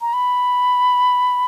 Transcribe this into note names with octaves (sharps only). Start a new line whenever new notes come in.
A#5
B5